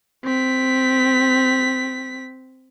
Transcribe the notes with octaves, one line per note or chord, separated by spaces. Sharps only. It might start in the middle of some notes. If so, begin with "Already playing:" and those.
C4 B6